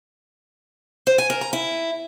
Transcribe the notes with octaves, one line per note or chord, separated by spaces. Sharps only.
C5
G#5
A#4
A#5
E4